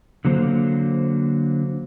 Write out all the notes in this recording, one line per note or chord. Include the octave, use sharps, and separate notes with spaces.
D3 F#3 A#3 C5